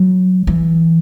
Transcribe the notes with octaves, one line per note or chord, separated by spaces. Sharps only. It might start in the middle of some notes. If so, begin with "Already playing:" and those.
Already playing: F#3
E3